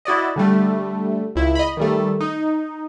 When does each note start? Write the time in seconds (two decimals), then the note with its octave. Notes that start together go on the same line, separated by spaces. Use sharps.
0.05 E4 F#4 D5 D#5
0.36 D3 G3 A3
1.35 C#2 E4
1.55 D#5 B5
1.77 D#3 G3 A3
2.20 D#4